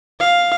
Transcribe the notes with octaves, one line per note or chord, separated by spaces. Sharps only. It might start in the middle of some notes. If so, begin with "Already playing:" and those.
F5